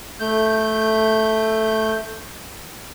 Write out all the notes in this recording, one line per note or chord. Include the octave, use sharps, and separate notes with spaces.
A3 G6